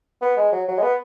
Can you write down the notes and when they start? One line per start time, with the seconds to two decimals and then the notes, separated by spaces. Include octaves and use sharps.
0.22 B3
0.37 G#3
0.52 F#3
0.68 F#3
0.78 G#3
0.83 B3